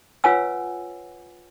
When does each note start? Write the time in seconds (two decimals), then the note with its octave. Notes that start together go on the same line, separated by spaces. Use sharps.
0.24 F4 B4 C#5 F#5 G#5 E6